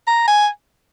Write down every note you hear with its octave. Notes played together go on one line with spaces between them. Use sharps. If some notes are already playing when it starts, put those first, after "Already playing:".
A#5
G#5